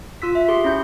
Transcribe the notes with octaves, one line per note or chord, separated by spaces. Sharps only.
F4 E6 B6
E5
G4 G#4 C6
C#4 E4 G6